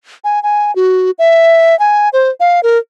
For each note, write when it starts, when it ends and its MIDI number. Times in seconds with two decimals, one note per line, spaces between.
0.24 0.42 80
0.43 0.74 80
0.76 1.11 66
1.19 1.78 76
1.79 2.09 80
2.13 2.30 72
2.40 2.60 77
2.63 2.78 70